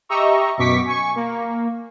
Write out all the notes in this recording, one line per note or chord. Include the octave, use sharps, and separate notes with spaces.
G4 D#5 E5 A#5 C#6 E6
F#2 B2 C#6 D6 B6
G#5 C#6
A#3